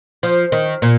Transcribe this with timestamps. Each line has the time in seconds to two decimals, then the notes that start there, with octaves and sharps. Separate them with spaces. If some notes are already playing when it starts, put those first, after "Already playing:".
0.23 F3
0.52 D#3
0.82 A#2